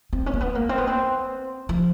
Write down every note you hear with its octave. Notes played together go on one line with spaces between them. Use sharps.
C4
C#4
A#3
B3
A#3
C4
B3
C4
F3